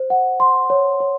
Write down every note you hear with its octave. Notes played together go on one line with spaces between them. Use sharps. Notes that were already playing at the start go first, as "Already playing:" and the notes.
Already playing: C5
F#5
C6
C#5
C#5